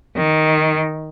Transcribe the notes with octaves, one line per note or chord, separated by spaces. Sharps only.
D#3